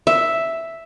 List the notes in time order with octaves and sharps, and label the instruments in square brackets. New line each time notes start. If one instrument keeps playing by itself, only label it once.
[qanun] E5